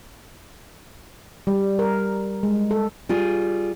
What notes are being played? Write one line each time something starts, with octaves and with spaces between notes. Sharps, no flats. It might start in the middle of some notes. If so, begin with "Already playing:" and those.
G3
A#4
G#3
A4
G3 F4 G#4